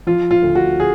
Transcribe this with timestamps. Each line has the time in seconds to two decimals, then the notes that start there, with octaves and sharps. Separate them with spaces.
0.07 F3 F4
0.31 F4
0.43 D2
0.55 F#4
0.80 G#4